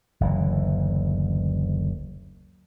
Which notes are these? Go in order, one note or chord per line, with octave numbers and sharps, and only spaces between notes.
F#1 D2 E3